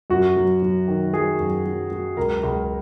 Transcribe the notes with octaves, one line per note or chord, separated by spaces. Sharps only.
F#2 F#4
F#3
F#3
D#3
F#3 G#4
F#2
F#3
F#3
C#2 A#4
C#2